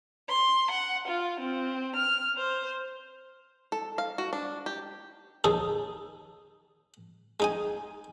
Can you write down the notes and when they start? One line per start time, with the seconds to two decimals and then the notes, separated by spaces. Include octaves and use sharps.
0.29 C6
0.71 F#5
1.08 F4
1.40 C4
1.96 F6
2.37 C5
3.72 A4
3.98 F5
4.18 F#4
4.33 D4
4.66 G4
5.44 D#2 D#4 G#4 A4
7.40 G#3 D#4 G#5